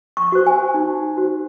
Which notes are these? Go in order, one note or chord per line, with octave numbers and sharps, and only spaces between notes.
C#6
F#4 C5
G#5
D#4
F#4 C5